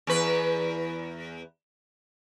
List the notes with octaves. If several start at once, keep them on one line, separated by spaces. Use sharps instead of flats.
E2 B4